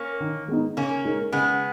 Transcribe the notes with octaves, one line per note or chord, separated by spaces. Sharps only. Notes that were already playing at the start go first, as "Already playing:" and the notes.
Already playing: A#3 C#4
D#3
G#3 B3 D#4
C#3 A#3 C#4
G#3 D#4 A#4
C#3 G#3 B3